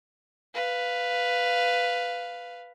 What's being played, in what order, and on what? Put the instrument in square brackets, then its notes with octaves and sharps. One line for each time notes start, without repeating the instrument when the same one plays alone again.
[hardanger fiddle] B4 F5